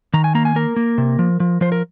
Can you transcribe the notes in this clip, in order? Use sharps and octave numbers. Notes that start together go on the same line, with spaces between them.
D#3 A#5
G#5
A#3 A#5
G#5
A#3 A#4
A#3
C3
F3
F3
F3 C5
A#4